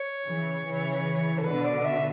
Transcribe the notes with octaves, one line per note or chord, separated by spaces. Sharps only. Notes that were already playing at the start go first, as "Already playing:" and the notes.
Already playing: C#5
C#3 E3
C#3 E3
A4
B2 D3 B4
D5
E5